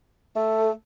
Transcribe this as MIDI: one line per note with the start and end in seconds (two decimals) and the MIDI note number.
0.36 0.71 57
0.36 0.71 69